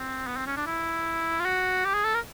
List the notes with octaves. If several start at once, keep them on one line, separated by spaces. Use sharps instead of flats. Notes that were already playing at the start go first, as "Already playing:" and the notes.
Already playing: C4
B3
C4
C#4
D4
E4
F4
F#4
G4
G#4
A4
A#4